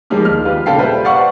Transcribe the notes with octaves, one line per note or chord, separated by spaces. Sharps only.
F3 G3 G#3 A#3 D#4 G4
D#2 F6
F4 G4 B4
A#2 C#3 A4 F5 G5 C7
G3 B4 C5 E5
D5 F5 F#5 C#6